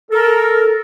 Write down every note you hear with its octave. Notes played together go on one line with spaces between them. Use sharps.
A4 A#4